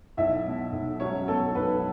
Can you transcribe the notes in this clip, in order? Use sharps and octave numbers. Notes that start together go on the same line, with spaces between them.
B1 E4 E5
B2
B1
F#3 C#4 C#5
B2 A4
B1 B4